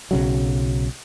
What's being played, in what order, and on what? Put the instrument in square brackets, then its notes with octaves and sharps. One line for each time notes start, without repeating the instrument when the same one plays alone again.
[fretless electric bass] B1 C#3 F#3